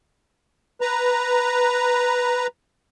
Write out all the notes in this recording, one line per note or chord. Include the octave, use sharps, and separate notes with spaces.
B4 A#5